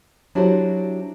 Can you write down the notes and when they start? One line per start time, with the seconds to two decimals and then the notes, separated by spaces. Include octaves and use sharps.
0.35 F#3 D4 E4 F#4 G4 C5